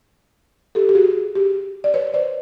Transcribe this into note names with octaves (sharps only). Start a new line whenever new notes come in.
G4 A4
G4
F#4 G#4
G4
D5
B4 C#5
C5 D5